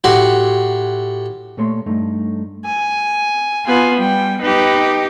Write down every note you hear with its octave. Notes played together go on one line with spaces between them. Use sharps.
A2 F#4 G4 F#5 C6
A#2 A3 C#5 C6
G2 A3 D#4
G#5
B3 F4 G#5
G3 G5
D#4 G4 B4